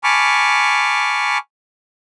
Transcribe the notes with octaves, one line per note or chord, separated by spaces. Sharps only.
G#5 A5 B5 C#6 D6 F6